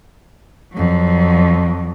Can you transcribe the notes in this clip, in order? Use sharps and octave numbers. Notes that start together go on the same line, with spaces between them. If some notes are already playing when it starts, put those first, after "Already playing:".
F2 F#3